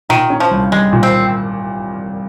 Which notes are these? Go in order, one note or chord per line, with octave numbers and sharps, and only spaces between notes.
A#2 D#3
C#4
F3
C2
G3 G#3
A#2
C4